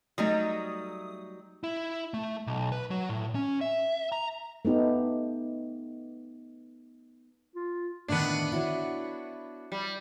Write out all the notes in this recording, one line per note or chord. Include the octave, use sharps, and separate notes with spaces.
F#3 G3 A3 D#4 D#6
E4
A3
B1
B4
F#3
A2
C#4
E5
A#5
A3 B3 D#4 G4
F4
A2 D3 D#3 B3 D4
E4 F#4 C#5
G3